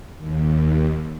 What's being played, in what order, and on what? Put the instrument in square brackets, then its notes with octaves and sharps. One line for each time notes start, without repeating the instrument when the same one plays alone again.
[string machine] D#2